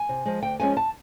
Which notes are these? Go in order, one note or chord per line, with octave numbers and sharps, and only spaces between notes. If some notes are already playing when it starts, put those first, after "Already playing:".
Already playing: G#5
C3
F3 G#3
D2 G5
C#3 F3 G#3 C#4 G#5
A5